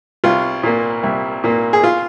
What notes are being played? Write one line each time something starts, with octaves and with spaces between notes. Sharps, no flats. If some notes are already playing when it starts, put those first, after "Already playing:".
C2 F4
A#2 A#3
C2
A#2 A#3
G#4
F4